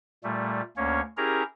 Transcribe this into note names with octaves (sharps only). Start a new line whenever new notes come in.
A#2 G3 A3
D2 A#3 C#4 C#5
C#4 E4 G4 G#4 A#4 A#5